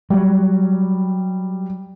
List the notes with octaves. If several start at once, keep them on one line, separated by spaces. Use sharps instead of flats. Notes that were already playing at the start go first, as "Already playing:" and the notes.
F#3 G3